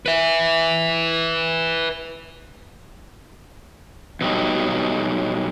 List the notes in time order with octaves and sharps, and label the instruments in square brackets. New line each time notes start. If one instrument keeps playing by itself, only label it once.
[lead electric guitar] B4 E5
[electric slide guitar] B2 F#3 G3 D#4